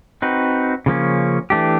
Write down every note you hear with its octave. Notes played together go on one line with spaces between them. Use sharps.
C4 D#4 F#4 B4
C#3 F3 A#3 C#4
E3 A3 D4 G4